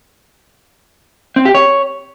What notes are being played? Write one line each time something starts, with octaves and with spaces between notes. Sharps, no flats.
C4
G4
C#5